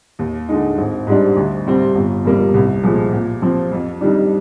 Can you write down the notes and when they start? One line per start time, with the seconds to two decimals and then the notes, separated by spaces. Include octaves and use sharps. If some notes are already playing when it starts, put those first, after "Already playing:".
0.19 D#2
0.49 D3 G#3 D#4
0.78 G#1
1.07 G#2 G3 D4
1.36 D2
1.66 C3 G3 C4
1.95 G1
2.25 F2 C3 G3 A#3
2.54 C2
2.83 A#2 F3 G#3
3.13 A#2
3.42 F3 C4
3.72 F2
4.01 D#3 G3 D4